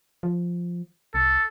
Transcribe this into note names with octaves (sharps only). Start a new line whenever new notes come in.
F3
C2 A4